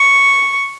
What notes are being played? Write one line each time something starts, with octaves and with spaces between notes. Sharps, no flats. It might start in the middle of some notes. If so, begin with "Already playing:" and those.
Already playing: C#6